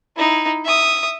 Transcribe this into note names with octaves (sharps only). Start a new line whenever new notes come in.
D#4 E4
E5 D#6